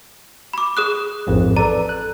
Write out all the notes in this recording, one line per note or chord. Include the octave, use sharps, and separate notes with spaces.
B5 D6
G#4 D#6 F#6
A1 F2 G#2
A4 B4 D5 A#5
F#6